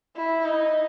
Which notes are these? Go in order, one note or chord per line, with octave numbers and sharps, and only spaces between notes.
E4
D#4